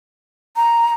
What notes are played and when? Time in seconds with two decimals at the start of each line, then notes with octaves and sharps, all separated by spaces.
0.56 A#5